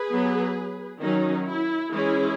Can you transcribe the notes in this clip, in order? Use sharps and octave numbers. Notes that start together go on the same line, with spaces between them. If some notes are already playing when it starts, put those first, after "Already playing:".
Already playing: G#4 B4
F#3 B3
D#3 F#3 C#4 D#4
E4
E3 G#3 C#4 E4 G#4